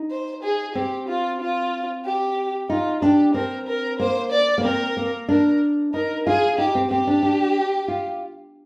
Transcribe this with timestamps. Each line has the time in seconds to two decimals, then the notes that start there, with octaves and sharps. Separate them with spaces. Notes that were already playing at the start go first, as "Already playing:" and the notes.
Already playing: D#4
0.11 C5
0.43 G#4
0.75 C4 G4
1.08 F4
1.41 F4
2.05 G4
2.70 D#4 F4
3.02 D4 G4
3.34 C4 A#4
3.67 A#4
3.99 A#3 C5
4.32 D5
4.58 A#3
4.64 C4 A#4
4.97 A#3
5.29 D4 A#4
5.94 D#4 A#4
6.26 F4 G#4
6.58 D#4 G4
6.75 C4
6.91 C4 G4
7.07 D4
7.23 D4
7.88 F4